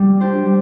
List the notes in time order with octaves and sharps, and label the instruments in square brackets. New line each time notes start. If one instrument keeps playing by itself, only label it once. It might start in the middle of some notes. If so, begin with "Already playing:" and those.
Already playing: [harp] G3
D4 G4 C5
G3